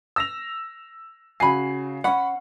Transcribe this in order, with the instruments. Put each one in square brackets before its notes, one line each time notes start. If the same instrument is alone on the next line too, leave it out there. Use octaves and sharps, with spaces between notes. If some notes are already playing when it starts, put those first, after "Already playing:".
[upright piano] E6 A#6 F7
[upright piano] C#3 F#4 C7 [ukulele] G#5 B5
[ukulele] C#4 F#5 [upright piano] B5 C#6